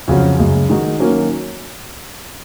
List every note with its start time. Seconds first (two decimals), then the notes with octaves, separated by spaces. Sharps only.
0.08 F2 C#3 F#3 C#4 F#4
0.39 F#2 C#3 G#3
0.69 D#3 G#3 D#4 F#4
1.00 D#3 F#3 A#3 C#4